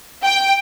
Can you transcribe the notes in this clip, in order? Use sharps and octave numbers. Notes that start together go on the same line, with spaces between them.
G5